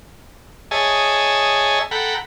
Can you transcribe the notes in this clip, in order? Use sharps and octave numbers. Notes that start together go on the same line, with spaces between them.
G#4 C#5 D#5 E5 G#5 A5
A4 F#5 G5 A#5 B5